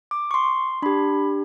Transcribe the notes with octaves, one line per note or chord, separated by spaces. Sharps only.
D6
C#6
C6
D4 G4 B5